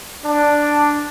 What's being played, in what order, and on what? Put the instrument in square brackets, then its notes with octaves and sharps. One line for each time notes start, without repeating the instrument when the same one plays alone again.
[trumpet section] D4